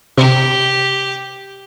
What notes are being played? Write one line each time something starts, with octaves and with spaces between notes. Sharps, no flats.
C3 G4